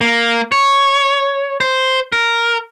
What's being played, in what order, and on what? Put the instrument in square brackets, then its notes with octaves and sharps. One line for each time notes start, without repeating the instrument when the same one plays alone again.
[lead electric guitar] A#3
C#5
C5
A#4